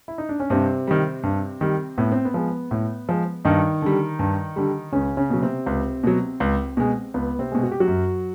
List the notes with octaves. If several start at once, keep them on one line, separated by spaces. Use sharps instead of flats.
E4
D#4
D4
C#4
G2 C3 C4
D#3 G3
G2
D#3 G3
A2 B3
C4
B3
F3 G#3
A2
F3 G#3
G2 D#3 D#4
D3 G3
G2
D3 G3
C#2 C#3 C#4
C#3 C#4
B2 F#3
C3 C4
C#2
B2 F#3
C#2
B2 G#3
C#2 B3
C3 C4
B2 G#3
F#4
G4
F#3 F#4
F#2